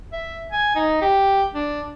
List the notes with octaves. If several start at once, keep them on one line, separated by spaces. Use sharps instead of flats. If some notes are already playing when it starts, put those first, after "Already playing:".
E5
G#5
D#4
G4
D4